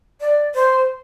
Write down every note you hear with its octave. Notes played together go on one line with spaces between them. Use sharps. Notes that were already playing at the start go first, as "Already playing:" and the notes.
D5
C5